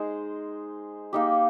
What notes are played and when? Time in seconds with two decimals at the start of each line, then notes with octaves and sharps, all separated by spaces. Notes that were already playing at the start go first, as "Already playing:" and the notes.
Already playing: G#3 D#4 G#4 C5
1.13 A#3 D#4 G4